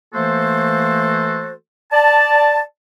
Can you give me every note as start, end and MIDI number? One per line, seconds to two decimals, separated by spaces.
0.14 1.53 52
0.14 1.53 57
0.14 1.53 58
0.14 1.53 66
0.14 1.53 69
0.14 1.53 72
1.92 2.61 74
1.92 2.61 81